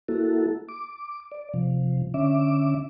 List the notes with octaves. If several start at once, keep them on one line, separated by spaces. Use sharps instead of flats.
A#3 E4 F#4 A4
D6
D5
C3 F3
D3 C#4 E5 D6